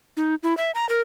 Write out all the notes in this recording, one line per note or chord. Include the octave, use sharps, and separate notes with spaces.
D#4
E4
E5
A#5
A#4